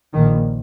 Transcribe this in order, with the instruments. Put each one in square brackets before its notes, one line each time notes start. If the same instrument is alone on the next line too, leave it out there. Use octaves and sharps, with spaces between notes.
[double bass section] A#1 A#2 D#3